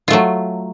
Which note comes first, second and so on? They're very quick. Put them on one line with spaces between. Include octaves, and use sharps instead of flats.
F4 A3 F#3